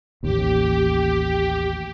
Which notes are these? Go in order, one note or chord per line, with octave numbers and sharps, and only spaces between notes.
A1 D#2 G4